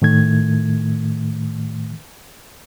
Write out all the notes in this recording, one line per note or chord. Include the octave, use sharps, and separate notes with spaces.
A2 D#3 A3 G#6